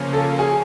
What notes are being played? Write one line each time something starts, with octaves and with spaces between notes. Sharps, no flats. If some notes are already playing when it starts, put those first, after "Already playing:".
Already playing: C#3 F3 A#3 C#4
A4
G#4